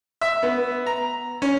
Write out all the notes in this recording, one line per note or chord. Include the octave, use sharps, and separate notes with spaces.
E5
B3
A#5
C#4